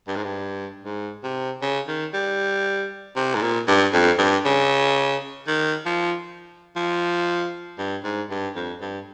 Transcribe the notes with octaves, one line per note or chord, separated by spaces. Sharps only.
G2
G#2
G2
G#2
C3
C#3
D#3
G3
C3
G#2
A#2
G2
F2
G2
C#3
D#3
F3
F3
G2
G#2
G2
F2
G2